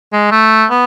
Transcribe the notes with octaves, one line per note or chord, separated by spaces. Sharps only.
G#3
A3
B3